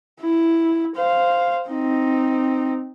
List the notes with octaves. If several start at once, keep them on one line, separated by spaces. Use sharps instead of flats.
E4
C5 F5
C4 D#4